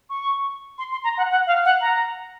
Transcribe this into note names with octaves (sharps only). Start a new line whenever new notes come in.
C#6
C6
C6
A#5
F#5
F#5
F5
F#5
A#5